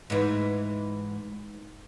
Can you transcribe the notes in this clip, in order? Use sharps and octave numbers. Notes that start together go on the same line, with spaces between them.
G#2 E3